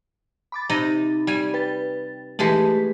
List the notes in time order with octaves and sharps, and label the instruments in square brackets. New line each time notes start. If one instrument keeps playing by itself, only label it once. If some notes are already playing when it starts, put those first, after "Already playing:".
[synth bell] B5 D6 A6
[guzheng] C3 D#4 D#5
G3 G#5
[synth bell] B4 G5 A6
[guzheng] E3 G#3 A5 [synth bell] A3 G4 B6